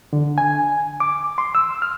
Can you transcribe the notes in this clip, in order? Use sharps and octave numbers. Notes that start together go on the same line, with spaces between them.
D3
G#5
D6
C6
E6
F6